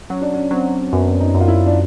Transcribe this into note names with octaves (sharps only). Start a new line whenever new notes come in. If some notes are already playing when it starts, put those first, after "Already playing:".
F#3 C#4
D4
C#4
F#3 C4
F#2 B3
D#4
F#2
F4
E4
D4